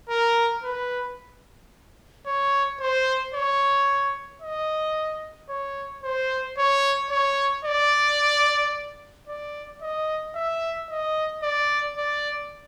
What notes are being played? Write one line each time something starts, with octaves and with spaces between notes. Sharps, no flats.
A#4
B4
C#5
C5
C#5
D#5
C#5
C5
C#5
C#5
D5
D5
D#5
E5
D#5
D5
D5